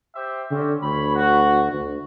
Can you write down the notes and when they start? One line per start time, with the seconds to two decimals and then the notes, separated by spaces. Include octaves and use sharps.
0.14 G4 C5 E5
0.51 D3 C4 C#4 G4
0.83 D2 C#5 B5
1.15 F#4
1.73 D2